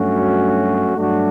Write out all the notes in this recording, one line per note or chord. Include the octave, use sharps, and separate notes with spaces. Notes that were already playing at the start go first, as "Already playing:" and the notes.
Already playing: G2 F#3 A3 C#4 F#4
G2 F#3 A3 D4 F#4